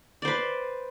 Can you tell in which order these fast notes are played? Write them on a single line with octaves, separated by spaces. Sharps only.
D5 C5 B4